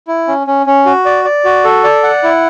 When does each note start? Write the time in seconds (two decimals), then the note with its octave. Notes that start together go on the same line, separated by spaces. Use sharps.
0.07 E4
0.28 C#4
0.47 C#4
0.66 C#4
0.85 F#4
1.05 D5
1.25 D5
1.45 F#4
1.64 A4
1.84 D5
2.03 F#5
2.23 E4